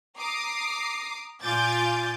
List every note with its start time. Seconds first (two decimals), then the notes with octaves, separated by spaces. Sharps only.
0.19 A#5 D6 D#6 C7
1.43 A#2 F4 G#5 D6 G6 A6